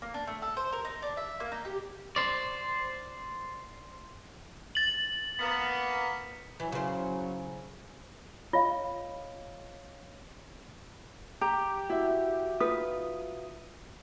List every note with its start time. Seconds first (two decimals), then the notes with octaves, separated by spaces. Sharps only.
0.02 A#3
0.14 D4
0.27 A3
0.42 A4
0.57 C5
0.73 A#4
0.85 D#4
1.02 D4
1.17 E5
1.40 A#3
1.52 D#4
1.65 G4
2.16 C5 D5
4.75 A6 F#7
5.40 A#3 B3
6.60 E3 F#3
6.72 C#3 C5
8.53 F4 C#5 D#5 F5
11.41 G4 A#5
11.90 E4 F#4 E5
12.60 D#4 F4 B4 D#6